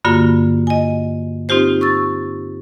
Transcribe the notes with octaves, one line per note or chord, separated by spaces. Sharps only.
G2 D3 A#3 F4 F#4
D#5 G#5
C4 D#4 F4 G4 C5
C#6 E6 A6